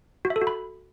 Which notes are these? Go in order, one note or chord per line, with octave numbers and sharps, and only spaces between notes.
F#4
E5
A4
F#4
B5